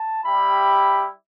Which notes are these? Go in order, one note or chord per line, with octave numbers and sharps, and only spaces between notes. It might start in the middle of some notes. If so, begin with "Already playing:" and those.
Already playing: A5
G3 E4 G4 B5